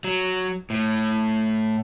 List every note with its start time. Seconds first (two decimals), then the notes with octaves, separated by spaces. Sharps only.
0.04 F#3
0.70 A2